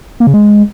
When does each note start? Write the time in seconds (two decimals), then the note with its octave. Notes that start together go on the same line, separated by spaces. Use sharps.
0.20 A#3
0.27 C#3
0.34 G#3